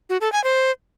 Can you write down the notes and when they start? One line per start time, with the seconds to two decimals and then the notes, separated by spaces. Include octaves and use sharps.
0.10 F#4
0.21 A4
0.32 G#5
0.44 C5